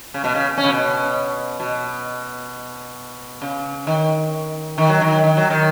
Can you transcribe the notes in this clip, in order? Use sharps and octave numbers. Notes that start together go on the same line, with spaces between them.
C#3
B2
C#3
C#4
C#3
B2
B2
C#3
D#3
D#3
F#3
D#3
D#3
F#3
D#3